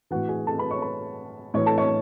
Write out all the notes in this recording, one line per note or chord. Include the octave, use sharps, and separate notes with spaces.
A2 E3 F#4 F#5
G#4 G#5
A4 A5
B4 B5
C#5 C#6
B4 B5
A2 E3 C#5 C#6
A4 A5
C#5 C#6